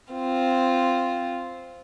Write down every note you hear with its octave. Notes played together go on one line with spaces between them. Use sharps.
C4 F4